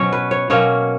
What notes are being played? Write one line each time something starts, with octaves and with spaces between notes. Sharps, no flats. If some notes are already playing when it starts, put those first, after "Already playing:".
Already playing: B2 F#3 C#4 C#5
B4
C#5
B2 F#3 A#3 C#4 C#5